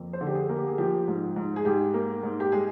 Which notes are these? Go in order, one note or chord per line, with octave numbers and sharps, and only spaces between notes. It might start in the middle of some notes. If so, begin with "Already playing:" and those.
Already playing: F2 A#3
C5
D3
G4
G#4
A#3
G4
G#4
F3 G4
G#2
G#2
G#4
G#2 G4
A#3
G#2
G4
G#3 G#4